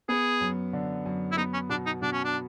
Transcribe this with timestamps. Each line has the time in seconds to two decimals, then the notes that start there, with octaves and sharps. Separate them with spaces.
0.09 B3 G#4
0.41 F#2
0.73 D3
1.06 F#2
1.32 E4
1.37 B3 D#4
1.53 C#4
1.69 B2 D4
1.86 D#4
2.02 B2 D4
2.13 C#4
2.24 D4